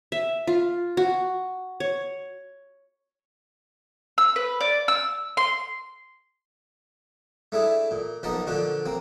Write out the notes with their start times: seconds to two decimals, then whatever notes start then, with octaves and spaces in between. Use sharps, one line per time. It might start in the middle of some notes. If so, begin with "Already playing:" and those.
0.12 E5
0.47 F4
0.97 F#4
1.80 C#5
4.18 E6
4.36 B4
4.61 D5
4.88 E6
5.37 C6
7.52 A3 D4 E4 G#4
7.91 A#2
8.23 B1 F3 A#3 B3 D#4 A5
8.47 A#2 D3 F3 D4 F#4
8.86 A#3 C4